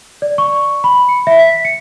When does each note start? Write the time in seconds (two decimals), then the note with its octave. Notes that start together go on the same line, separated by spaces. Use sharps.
0.22 D5
0.38 C#6
0.84 B5
1.09 C#7
1.27 E5
1.39 B6
1.65 C#7